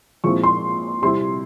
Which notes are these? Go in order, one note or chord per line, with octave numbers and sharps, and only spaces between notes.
A#2 F3 G#3 C4 E4 C#6
C6
C3 G3 C4 E4 C6